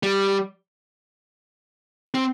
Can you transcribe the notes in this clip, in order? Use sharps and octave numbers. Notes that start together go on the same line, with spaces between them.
G3
C4